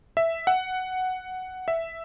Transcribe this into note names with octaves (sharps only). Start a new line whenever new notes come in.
E5
F#5
E5